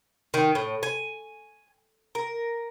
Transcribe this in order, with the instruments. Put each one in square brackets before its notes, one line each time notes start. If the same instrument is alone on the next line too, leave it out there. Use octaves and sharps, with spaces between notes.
[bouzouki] D#3
A2
G#5
A#4